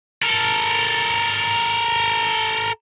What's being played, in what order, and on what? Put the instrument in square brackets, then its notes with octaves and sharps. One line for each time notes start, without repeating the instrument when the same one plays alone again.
[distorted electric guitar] A4 A#4